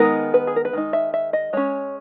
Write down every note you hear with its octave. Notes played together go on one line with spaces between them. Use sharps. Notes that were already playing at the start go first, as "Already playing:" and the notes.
Already playing: D#3 G#3 B3 D#4 A#4
B4
G#4
A#4
B4
D#3 G#3 D#4
E5
E5
D#5
G#3 C#4 C#5